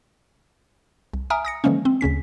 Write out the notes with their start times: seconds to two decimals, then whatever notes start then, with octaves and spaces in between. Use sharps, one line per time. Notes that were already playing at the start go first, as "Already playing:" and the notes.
1.14 C2
1.30 E5 G#5 A#5 D#6 F6 D7
1.45 D#6 A#6 C#7
1.64 D3 E3 F3 G#3 A#3 C#4
1.85 C4
2.01 D2 C#3 C#4 B6